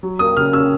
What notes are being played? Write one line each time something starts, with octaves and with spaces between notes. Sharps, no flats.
F#3
A#3 D#6
C#3 F6
C#4 E6